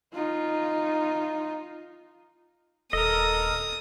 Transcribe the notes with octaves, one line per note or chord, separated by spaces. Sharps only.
D#4 F4
D#1 A4 A#4 D#5 D#6